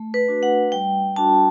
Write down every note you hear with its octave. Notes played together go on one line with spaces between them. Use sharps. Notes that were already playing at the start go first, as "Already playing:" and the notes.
Already playing: A3
B4
D4 F#4
F#5
G3 G5
D4 F#4 A5